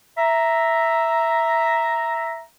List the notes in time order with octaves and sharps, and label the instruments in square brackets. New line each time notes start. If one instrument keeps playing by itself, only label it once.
[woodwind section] E5 A#5